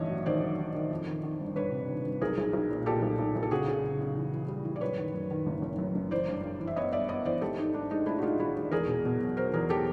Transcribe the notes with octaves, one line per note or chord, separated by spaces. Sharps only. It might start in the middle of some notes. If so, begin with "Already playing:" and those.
Already playing: A1 G2 D#3 C#5 D#5 E5
F#3
D#3 C5 D5
F#3
D#3
D#3
F2
D#3
D#3
G1
G1 B4 C#5
C3
D#3
G1
B1 G#4 A#4
B1
B1
A#2
A#2 G4 A4
B1
B1
B1
A4
C#3 F#4 G#4
C#3
C#3
C#3
E3
E3
G3
E3
D5
F#2 B4 C#5
D#3
F#2
D#3
F#1
F#1
F#2
F#1
E3 C5 D5
G2
G2
E3
E5
B3 C#5 D#5
G2 D5 E5
B3 C#5 D#5
E3 C5 D5
G#1 G4 A4
G#2 D#4
G#2 D4
G#3 D#4
G#3 D4 E4
F#4
G#3 D#4 F4
G#1 E4 F#4
G#1
E2 G#4 A#4
B2
B2
F#3
F#3 A#4 C5
E2 G#4 A#4
F#3 G4 A4